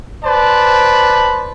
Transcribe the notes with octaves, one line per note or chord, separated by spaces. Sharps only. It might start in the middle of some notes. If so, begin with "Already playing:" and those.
B4 C5 D5 A5